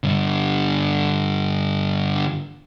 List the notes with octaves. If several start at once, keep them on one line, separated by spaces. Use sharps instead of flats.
G2 D3